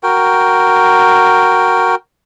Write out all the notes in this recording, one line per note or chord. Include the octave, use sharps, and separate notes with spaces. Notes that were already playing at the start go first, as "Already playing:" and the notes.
F#4 A#4 G5